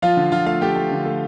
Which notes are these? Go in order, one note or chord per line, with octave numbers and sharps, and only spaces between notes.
F3 F4 F5
D3
D3 F4 F5
A3 F4 F5
A3 G4 G5
A3
D3
A3